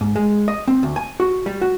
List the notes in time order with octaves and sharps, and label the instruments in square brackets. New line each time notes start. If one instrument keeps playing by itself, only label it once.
[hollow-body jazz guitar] G#2
G#3
D#5
C4
D2
G#5
F#4
G3
F#4